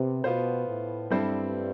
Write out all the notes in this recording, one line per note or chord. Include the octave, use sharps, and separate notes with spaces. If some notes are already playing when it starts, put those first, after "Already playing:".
Already playing: C3 B3
B2 B3 F4 C5
A2
G2 G3 C4 E4 A4 C5